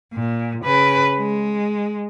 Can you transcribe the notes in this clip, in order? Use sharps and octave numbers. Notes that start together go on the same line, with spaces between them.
A#2
C#3 B4
G#3